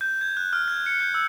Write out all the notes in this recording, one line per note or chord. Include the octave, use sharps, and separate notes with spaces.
G6
G#6
F#6
F6
G#6
C#7
G6
E6